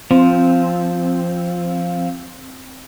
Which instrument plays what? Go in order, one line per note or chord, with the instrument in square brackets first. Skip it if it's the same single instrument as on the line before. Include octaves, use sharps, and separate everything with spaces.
[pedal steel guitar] F3 [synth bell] C4